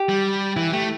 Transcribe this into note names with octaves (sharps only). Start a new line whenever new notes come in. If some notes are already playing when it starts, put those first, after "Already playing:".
Already playing: G4
G3
E3 E4
A3 G4